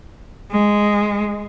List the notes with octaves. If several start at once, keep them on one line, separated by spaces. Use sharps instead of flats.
G#3